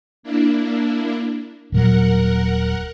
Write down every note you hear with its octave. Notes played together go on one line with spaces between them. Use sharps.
A#3 D4 E4
D#1 A#2 F#3 A#4 F#5